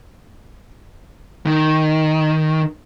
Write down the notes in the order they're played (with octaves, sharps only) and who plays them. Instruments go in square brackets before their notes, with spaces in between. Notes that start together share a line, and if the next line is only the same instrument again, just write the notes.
[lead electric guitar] D#3